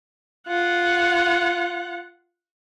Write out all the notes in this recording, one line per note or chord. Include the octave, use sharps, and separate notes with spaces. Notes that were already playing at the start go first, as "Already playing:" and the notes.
F4 F#5